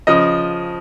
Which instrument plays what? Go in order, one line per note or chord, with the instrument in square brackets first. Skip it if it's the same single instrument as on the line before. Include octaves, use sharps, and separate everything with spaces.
[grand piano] C#3 F3 D#5